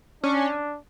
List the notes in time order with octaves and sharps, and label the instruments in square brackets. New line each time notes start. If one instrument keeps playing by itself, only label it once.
[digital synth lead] C#4 [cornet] D4